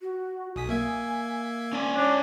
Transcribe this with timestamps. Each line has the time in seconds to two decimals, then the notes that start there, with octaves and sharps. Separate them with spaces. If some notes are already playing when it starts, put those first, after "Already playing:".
0.01 F#4
0.56 B1 G#5 D#6 B6
0.69 A#3 E5 G#6
1.73 C#4 D5 G#5 D6
1.96 D4 C#5